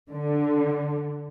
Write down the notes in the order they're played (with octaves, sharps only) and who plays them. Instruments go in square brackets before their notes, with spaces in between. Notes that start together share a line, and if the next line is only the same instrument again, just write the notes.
[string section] D3